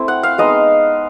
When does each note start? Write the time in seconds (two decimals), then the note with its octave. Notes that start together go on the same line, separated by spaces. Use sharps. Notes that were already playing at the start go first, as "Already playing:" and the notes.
Already playing: A3 C4 E4
0.08 F#5
0.23 F5
0.38 G#3 B3 D#4 D#5